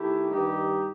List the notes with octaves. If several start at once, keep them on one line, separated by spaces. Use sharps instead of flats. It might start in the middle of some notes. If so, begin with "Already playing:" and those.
Already playing: D#3 A3 E4 G4
G2 D#3 G3 D#4 G4